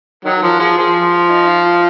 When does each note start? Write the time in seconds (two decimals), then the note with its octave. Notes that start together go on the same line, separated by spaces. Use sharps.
0.25 D#3 F#3 A#4
0.42 F3 A#4
0.59 F3 G#4
0.77 F3 G#4
1.12 F4
1.30 D#4
1.47 F4
1.65 F4